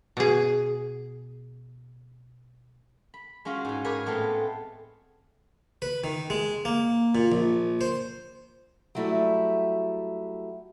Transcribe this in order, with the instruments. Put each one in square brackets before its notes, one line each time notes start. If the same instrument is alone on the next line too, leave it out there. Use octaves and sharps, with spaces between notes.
[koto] B2 G#4
[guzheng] B5
G#3 C#4 F4 F#4 F5
G#2 D#4
G#4 A#4 B4 C#5 D5 G#5
A2 G#3 A3 B3 C4 F4
[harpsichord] B4
D#3
G#3
A#3
A#2
A#1
C5
[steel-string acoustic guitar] F#3 G3 A3 E4